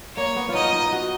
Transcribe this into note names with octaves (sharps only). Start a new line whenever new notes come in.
A#3 C#5
B3
F4
D#4 D#5
F4
D#4
F#4